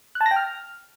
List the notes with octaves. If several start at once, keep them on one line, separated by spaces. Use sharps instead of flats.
F#6
A5
A#6
G5
F6